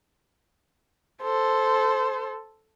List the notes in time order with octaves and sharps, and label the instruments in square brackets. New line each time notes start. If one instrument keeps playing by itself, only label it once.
[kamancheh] A4 C5